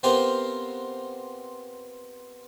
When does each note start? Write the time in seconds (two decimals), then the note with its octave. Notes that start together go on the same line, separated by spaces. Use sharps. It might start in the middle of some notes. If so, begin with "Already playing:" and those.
0.03 B3 C4 F4 G4 A#4 C5